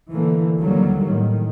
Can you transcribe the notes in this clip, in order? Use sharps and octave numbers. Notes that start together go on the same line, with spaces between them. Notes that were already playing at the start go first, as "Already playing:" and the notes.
D3 E3 A3 A#3
D#2 D3 F#3 G3 A#3
A2 D#3